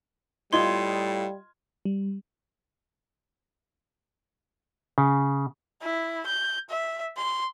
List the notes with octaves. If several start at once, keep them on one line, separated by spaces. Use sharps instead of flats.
A2 G3 F4 D#5 C6 G#6
G3
C#3
E4
G6
E5
C6